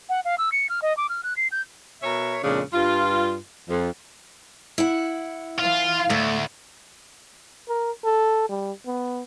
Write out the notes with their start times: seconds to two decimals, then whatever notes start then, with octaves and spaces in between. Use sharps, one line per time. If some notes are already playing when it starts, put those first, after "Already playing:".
0.09 F#5
0.25 F5
0.38 E6
0.52 C#7
0.70 F6
0.82 D#5
0.97 D6
1.09 F6
1.23 F#6
1.37 C7
1.52 G6
2.02 B2 A#4 C#5 E5
2.43 F2 A#2 C#3 G#3 D4
2.72 G2 F4
3.70 F2
4.78 E4 F#5
5.59 E3 F4 F5
6.10 D2 A2 A3
7.69 A#4
8.05 A4
8.49 G3
8.86 B3